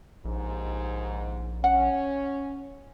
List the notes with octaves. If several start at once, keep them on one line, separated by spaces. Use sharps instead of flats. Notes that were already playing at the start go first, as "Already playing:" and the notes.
A#1 D#2 G#2
C#4 F#5